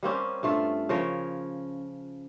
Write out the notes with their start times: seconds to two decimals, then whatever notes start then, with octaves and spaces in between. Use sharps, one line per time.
0.03 G3 A#3 C4 C#4
0.43 G2 A3 F4 A4
0.89 C#3 F3 A#4 C#5